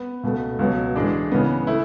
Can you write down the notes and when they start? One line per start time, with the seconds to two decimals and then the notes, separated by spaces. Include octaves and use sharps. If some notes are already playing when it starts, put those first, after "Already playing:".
Already playing: B3
0.23 C#2 B2 A3
0.59 C#2 B2 F#3
0.96 A2 E3 G#3 D4
1.32 C#3 E3 B3
1.67 A3 E4